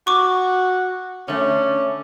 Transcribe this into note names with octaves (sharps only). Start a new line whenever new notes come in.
F#4 C#6 D6
D3 A3 C#4